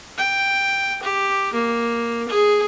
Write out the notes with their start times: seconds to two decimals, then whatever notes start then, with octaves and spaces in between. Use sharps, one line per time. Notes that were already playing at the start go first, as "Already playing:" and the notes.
0.18 G5
1.03 G4
1.53 A#3
2.29 G#4